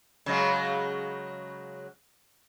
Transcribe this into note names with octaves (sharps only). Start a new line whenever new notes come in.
C#3 F#3 G#3